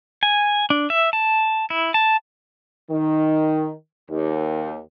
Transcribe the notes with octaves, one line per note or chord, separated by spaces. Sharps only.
G#5
D4
E5
A5
E4
A5
D#3
D#2